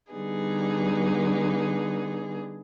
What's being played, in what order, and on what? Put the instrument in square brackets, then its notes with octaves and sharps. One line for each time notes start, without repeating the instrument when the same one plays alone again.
[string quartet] D3 G3 B3 D#4 G#4